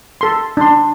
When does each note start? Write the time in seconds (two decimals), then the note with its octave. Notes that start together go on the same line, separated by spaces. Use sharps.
0.21 A4 C6
0.57 D4 C6